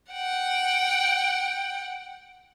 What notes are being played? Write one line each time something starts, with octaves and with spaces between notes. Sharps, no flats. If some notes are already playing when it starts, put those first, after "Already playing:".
F#5 G5